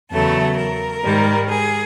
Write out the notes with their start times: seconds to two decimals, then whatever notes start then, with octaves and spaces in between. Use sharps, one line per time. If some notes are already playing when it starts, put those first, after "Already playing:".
0.10 E2 C#3 F#3 A3 A4
0.57 A#4
1.03 G#2 D#3 G3
1.49 G#4